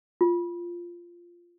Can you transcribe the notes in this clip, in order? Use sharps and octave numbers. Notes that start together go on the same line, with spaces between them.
F4